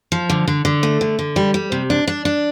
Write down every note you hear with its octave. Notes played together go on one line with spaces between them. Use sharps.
F3
D3
D3
D3
A3
D3
D3
G3
G3
C3
D4
D4
D4